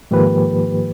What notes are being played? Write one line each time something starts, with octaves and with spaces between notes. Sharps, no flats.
G#2 D#3 F3 A#3 G4 B4